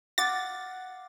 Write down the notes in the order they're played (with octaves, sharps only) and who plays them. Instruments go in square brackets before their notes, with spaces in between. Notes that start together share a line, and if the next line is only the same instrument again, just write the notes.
[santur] F5 F#5 D6 [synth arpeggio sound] A6